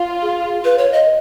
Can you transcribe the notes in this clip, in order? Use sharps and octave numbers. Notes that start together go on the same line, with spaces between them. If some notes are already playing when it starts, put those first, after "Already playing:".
Already playing: F4
G#4
B4
C#5
D#5